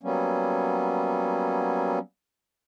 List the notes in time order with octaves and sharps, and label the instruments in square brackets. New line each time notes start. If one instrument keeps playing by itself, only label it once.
[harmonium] F#3 G3 A#3 B3 C#4